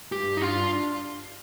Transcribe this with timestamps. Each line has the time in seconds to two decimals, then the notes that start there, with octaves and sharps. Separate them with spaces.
0.12 G2 G4
0.37 D#4
0.41 D4 F4